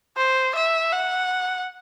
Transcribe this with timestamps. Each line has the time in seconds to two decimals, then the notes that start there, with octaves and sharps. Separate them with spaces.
0.17 C5
0.55 E5
0.92 F#5